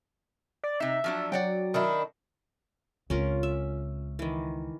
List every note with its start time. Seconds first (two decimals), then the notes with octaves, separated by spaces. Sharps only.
0.64 D5
0.80 C3 D#4 E5
1.04 F3 F#3 D4
1.32 F#3 D5 F#5 G5
1.74 D#3 D4 E4
3.10 C#2 C4 C#4 F4 A#4
3.43 E5
4.19 D#3 E3